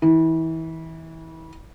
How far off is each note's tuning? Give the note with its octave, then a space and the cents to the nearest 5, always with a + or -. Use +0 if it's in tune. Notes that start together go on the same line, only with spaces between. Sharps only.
E3 -30